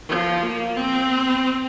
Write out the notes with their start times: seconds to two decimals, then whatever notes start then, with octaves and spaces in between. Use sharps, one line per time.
0.09 F3
0.43 A#3
0.77 C4